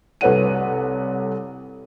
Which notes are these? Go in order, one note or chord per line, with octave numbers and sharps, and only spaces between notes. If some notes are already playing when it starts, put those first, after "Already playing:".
C2 A4 B4 C#5 F#5 D#7